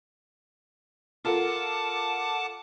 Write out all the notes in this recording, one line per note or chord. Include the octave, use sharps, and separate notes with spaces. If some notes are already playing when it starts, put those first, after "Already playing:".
F4 A4 A#4 F#5 A5 D6